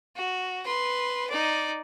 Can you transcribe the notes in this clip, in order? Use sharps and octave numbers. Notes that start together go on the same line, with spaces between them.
F#4
B4 C6
D#4 D5